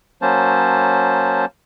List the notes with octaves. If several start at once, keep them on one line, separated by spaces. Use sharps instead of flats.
F#3 A#3 C#4 C5 A5